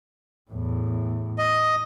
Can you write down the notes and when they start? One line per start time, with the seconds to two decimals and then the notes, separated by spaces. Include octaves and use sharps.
0.51 E2 A2
1.38 D#5